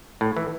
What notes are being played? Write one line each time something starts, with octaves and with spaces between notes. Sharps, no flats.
A2
E3